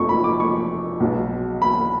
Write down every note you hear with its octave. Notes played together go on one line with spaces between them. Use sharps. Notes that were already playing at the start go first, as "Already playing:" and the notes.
Already playing: F1 F2 F3 A3 C#6
B5
D6
C#6
B1 B2 G#3 B3
B5